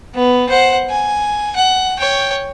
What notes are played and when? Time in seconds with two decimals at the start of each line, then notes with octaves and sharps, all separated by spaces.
0.14 B3
0.49 C5 F#5
0.90 G#5
1.56 F#5
1.99 C#5 G5